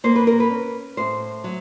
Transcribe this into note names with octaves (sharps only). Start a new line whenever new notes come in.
A#3 C5
B4
A#4
B4
C#4
A2 C5
F#3